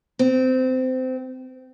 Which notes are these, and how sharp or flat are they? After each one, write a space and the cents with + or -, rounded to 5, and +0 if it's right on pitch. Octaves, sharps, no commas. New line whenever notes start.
C4 -20